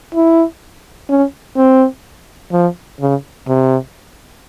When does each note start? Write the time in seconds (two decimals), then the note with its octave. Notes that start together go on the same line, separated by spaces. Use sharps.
0.15 E4
1.09 C#4
1.57 C4
2.52 F3
3.00 C#3
3.48 C3